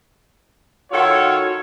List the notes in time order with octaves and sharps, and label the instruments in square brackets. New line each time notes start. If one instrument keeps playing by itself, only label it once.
[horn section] D#3 F4 F#4 A4 C#5